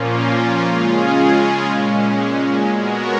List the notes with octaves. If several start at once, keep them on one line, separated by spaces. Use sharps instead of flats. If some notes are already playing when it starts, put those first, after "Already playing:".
Already playing: A#2 F3 A#3 C#4 F4
C#3 G#3 C#4 F4 G#4
A#2 G#3 C#4
G#3 B3 F#4 A#4 C#5